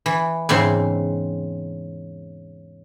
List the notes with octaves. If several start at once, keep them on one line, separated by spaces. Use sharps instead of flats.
E3
E2 G#2 C#3 C4 E5 C6